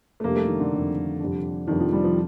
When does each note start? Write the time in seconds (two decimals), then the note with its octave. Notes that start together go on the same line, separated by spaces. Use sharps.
0.20 A3
0.24 F2 C3 G3 A#3 D4
0.36 A3
0.48 D#3
0.60 D3
0.72 F2 C3 G3 D4
1.20 F2 C3 G3 D4
1.67 F2 C3 D#3 G3 D4
1.80 F3
1.93 G3
2.04 F3